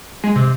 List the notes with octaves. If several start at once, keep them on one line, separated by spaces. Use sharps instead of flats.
G#3
C3